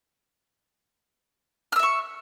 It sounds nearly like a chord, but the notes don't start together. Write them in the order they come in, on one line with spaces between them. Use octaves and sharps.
F6 E6 E5 C#6